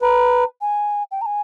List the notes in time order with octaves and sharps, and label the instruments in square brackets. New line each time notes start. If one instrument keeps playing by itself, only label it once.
[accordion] B4 [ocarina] A#5
[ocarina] G#5
G5
A#5
G#5